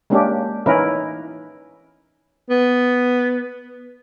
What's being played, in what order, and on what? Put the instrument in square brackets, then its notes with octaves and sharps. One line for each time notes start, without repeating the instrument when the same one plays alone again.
[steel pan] G#3 A#3 C#4 D4 G4
E3 C#4 D#4 E4 A#4 B4
[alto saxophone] B3